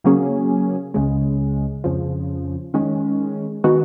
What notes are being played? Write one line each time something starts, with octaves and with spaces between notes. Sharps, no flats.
C#3 F#3 A#3 C#4 G#4
C#2 C#3 G#3
F2 C#3 F3
D#3 G#3 C#4
D#3 G#3 B3 D#4 F#4